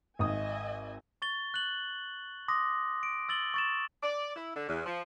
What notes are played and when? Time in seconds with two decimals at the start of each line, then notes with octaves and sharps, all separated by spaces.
0.19 G#1 D#5 E5 G#5 D#6
1.22 C#6 A6 G7
1.54 F#6 F#7
2.48 C6 D6 D#6 A#6
3.03 D7
3.29 E6 A6 F#7 G7
3.54 C#6 A6 E7
4.03 D5
4.36 E4
4.56 D3
4.69 E2
4.86 F3